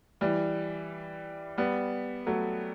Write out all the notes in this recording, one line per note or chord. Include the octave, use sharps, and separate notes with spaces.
E3 G3
G3 B3
F#3 A3